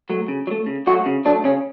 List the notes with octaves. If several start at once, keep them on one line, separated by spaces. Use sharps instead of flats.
F#3 A3
C#3
F#3
A3
C#3
F#3 A3 F#4
C#3
F#3 A3 D4
C#3 C#4